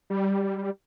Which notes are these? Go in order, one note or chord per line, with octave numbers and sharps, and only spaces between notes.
G3